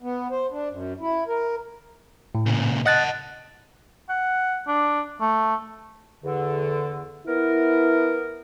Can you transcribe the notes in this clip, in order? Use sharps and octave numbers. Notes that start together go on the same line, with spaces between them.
B3
C5
D4
F#2
E4
A#4
A2
A#2 C#3
D#5 F#5 A5 F#6 A6
F#5
D4
A3
E2 D3
B3 E4 A#4